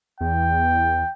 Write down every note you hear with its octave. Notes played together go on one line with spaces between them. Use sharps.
E2 G5